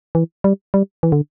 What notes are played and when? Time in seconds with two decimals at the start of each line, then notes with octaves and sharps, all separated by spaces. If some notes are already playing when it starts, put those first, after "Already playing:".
0.15 E3
0.44 G3
0.74 G3
1.03 E3
1.12 D3